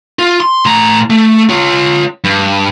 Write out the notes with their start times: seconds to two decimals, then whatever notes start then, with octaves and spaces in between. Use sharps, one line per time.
0.19 F4
0.40 C6
0.65 A2 A#5
1.10 A3
1.49 F4 C#5
2.24 G2